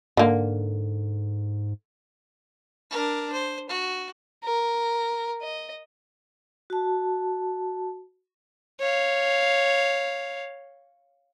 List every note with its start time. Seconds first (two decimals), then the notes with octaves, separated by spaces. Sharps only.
0.17 G#2 D3 A#3
2.91 D4 A#4
3.32 C5
3.69 F#4
4.44 A#4
5.42 D#5
6.70 F#4 A5
8.80 C#5 F5